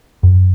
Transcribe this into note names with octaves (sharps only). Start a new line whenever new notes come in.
F#2